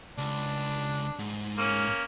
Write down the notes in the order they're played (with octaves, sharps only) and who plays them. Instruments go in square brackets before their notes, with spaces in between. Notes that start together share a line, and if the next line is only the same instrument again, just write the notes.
[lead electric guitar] C#2 [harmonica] D4
[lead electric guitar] G#2
[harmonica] A#3 C#4